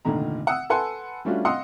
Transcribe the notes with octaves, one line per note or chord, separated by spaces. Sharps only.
F1 A#2 D3 D#3 A#5
F#5 D#6 E6
A4 B4 F#5 G#5 A5 C6
G3 A3 C#4 D4 F4 F#4
D#5 F5 F#5 C6 D#6 E6